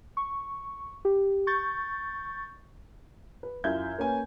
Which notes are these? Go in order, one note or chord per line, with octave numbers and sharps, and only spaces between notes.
C#6
G4
C#6 G6 A6
B4
F#2 E4 F4 E5 G6 G#6
A#3 C#4 B4 G#5